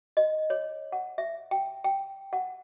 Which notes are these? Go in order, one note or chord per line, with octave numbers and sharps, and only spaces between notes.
D#5
C#5
F#5
E5
G5
G5
F#5